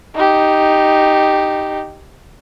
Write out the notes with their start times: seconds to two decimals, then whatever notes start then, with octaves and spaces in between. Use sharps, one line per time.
0.14 D#4 G4